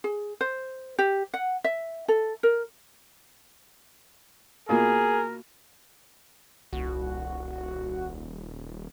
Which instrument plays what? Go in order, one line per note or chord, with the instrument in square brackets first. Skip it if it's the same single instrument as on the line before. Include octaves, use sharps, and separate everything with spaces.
[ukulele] G#4
C5
G4
F#5
E5
A4
A#4
[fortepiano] B2 A#3 F4 [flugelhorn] G#4 [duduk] A#4
[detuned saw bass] D#1 [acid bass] C2 [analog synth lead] F#4